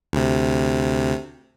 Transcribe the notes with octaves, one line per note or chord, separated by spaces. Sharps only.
D2 C3